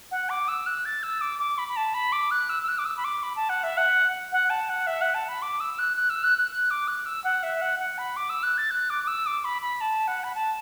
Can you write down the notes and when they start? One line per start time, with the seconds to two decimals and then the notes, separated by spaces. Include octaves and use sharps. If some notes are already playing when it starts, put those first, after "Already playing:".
0.11 F#5
0.30 D6
0.48 E6
0.66 F#6
0.85 A6
1.03 E6
1.21 D6
1.39 D6
1.58 B5
1.69 B5
1.76 A5
1.94 B5
2.12 D6
2.31 F#6
2.49 E6
2.63 E6
2.68 F#6
2.78 D6
2.85 E6
2.97 B5
3.04 D6
3.23 B5
3.36 A5
3.49 F#5
3.63 E5
3.77 F#5
4.32 F#5
4.50 A5
4.69 F#5
4.87 E5
5.01 F#5
5.14 A5
5.28 B5
5.42 D6
5.60 E6
5.79 F#6
5.97 F#6
6.10 E6
6.24 F#6
6.38 F#6
6.51 F#6
6.70 D6
6.88 F#6
7.06 E6
7.24 F#5
7.43 E5
7.61 F#5
7.79 F#5
7.98 B5
8.16 D6
8.30 E6
8.43 F#6
8.58 A6
8.71 F#6
8.90 D6
9.04 D6
9.07 E6
9.26 D6
9.44 B5
9.62 B5
9.81 A5
10.07 F#5
10.24 B5
10.35 A5